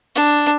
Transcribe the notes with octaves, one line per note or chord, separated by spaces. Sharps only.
D4